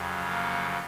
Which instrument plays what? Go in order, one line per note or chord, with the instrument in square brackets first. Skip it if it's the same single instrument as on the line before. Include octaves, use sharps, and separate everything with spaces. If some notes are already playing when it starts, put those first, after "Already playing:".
Already playing: [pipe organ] F2 C#3 F#3
A#3